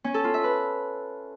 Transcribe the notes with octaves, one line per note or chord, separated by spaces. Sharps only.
C#4
A4
F4
E5
B4